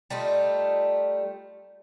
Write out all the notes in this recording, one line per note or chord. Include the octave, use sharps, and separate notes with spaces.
G3 A3 D#4 F4